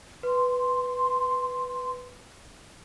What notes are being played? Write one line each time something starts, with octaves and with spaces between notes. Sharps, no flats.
B4 C6